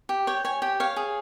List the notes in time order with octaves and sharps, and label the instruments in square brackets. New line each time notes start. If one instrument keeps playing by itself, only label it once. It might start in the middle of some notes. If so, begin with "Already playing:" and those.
[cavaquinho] G4
C#5 G5
C#5 G#5
G4 G5
C#5 F5
G#4